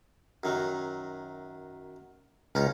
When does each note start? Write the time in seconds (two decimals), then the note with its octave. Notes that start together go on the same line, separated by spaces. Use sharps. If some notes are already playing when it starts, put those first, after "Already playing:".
0.43 F#2 D#3 F#3
2.55 C#2 C#4 D#4 F4